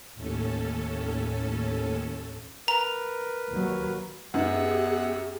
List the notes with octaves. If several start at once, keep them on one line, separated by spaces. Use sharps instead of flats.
D#2 A2 C#4 A4
A#4 B4 A#5
D#2 F#3
F#2 B3 D#4 G4 G#4 F#5